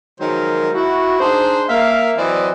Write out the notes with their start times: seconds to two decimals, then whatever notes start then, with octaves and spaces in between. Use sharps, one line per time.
0.20 D#3 F3 F#3 G#3 A#4 C5
0.74 E4 F#4
1.20 D4 D#4 G#4 C5
1.69 A#3 E5 F5
2.18 E3 F#3 C4 D5 D#5